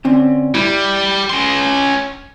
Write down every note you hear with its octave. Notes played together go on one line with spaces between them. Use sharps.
D3 C4 C#4
G3 E4 B5
C#4 C6